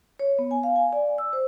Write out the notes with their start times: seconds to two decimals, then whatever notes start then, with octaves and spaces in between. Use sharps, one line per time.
0.19 C#5
0.39 B3
0.51 G#5
0.63 F5
0.76 G#5
0.93 D5
1.18 E6
1.33 C5